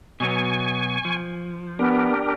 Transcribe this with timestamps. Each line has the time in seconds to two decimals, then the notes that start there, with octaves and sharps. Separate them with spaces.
0.20 B2 F#3 B3 G#5 C#6
1.05 F3
1.79 B3 D4 G4 A#4